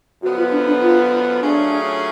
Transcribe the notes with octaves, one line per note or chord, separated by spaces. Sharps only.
F#2 D3 F3 B3 F#4
F4
D4
D4
F4
F#3 A3 C#4 D4 F4 G#4